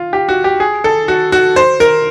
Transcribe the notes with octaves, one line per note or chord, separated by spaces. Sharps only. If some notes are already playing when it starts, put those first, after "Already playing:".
Already playing: F4
G4
F#4
G4
G#4
A4
F#4
F#4
C5
A#4